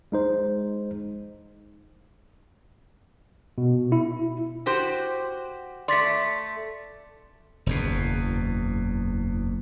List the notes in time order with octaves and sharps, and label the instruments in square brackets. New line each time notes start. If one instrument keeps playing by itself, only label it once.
[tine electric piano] G#3 D#4 C5
B2
E4
[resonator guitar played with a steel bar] F#4 G4 C5
[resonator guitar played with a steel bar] A3 D5 [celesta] C6 A6 B6
[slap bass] F#1 E2 B2